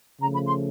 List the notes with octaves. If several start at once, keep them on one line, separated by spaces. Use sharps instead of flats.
C#3 F3 A3 A#5
B5
C6